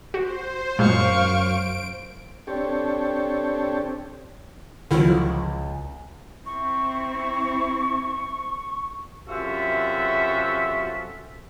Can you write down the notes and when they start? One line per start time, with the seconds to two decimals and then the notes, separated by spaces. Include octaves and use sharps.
0.14 F#4 C5
0.79 F#2 A#2 F#3 G#3 F5 C#6 D7
2.47 C4 D4 G4 A4 C#5
4.91 C#2 D3 D#3 F3 F#3 E4 F4
6.45 C4 E4 C#6
9.27 F#2 C3 F4 F#4 A4 E5